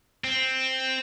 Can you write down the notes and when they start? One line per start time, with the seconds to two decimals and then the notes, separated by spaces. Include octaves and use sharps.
0.24 C4